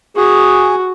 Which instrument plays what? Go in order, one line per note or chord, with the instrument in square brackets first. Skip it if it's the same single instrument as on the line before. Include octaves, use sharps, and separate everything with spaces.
[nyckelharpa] F#4 [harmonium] G#4